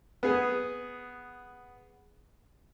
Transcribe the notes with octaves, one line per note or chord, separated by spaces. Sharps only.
B3 G#4